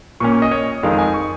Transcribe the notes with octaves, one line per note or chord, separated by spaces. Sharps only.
A#2 A#3 C#4 C#6
C#6
D#5
C#5
F2 D#3 G#3 D#4 F5
G#5
C#6